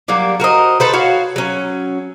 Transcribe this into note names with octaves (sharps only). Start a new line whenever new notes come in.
F#3 G3 A#3 D4
F#4 A#4 C5 D#5
A4 B4 C5
F#4 C#5 F5
F#3 C#4